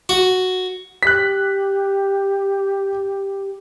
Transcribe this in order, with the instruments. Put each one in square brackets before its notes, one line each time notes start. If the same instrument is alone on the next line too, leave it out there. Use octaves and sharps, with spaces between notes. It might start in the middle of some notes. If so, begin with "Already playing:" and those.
[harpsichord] F#4
[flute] G4 [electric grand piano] F#6 B6